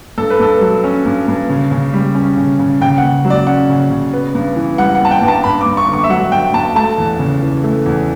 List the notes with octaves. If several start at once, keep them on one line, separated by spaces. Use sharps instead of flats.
G2 A4
B4
G2 A4
F#3
C#4
G2
G2
C#3
C#3
G3
C#4
C#3
C#3
C#3 G5
F#5
C#3
F#3
D5
C#4 F#5
C#3
C#3
B3
G2
E3
G3 F#5
F#5
B3 A5
G5
G2
A5
G2 B5
D6
G2
C#6
D3
C#6
E5
F#3 F#5
G2 G5
G2 A5
A3 A5
E2
C#3
E3
A3
E2